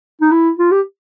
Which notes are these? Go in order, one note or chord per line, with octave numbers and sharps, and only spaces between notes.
D#4
E4
F4
G4